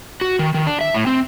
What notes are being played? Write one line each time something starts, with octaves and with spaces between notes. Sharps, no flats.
F#4
D#3
D#3
D4
E5
A2
C4